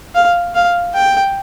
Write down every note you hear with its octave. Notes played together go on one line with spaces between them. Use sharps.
F5
F5
G5